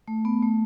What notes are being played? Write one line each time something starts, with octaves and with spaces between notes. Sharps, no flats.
A3
B3
A3